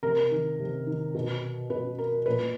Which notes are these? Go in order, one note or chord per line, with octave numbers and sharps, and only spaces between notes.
C3 A#4
D#3
C3
D#3
B2
B2 B4
A#4
A#2 B4